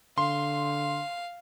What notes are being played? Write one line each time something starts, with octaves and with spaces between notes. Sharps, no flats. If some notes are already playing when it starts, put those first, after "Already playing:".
D3 F5 C6